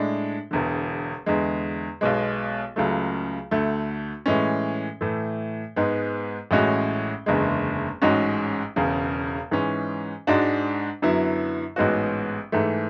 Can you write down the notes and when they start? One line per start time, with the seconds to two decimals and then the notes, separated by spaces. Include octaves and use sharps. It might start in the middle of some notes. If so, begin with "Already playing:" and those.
Already playing: A2 G#3 D4
0.51 E1 E2 D3
1.26 E2 D3 G#3
2.01 B1 B2 G#3
2.76 C#2 C#3 F#3 A3
3.51 D2 D3 A3
4.26 A2 E3 G#3 C#4
5.01 A2 E3 A3
5.76 G#2 G#3 B3
6.51 A1 A2 G#3 C#4 F#4
7.26 F#1 E2 D3 G#3
8.02 A1 G#2 G#3 C#4 F#4
8.76 E1 E2 C#3
9.51 G#2 E3 G#3 C#4
10.27 G#2 G#3 D4 F#4
11.02 F#2 D3 F#3 B3 E4
11.76 A1 G#2 G#3 B3 F#4
12.52 G#2 E3 A3